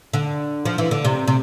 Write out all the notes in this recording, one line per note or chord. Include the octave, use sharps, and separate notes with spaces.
D3
F3
E3
D3
C3
C3